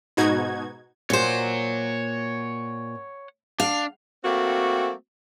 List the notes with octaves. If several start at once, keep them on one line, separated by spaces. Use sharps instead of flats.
G#2 B2 D#4 F#4 G#6
A#2 C5 C#5 F#5
D4 F5
G3 A3 A#3 C4 F#4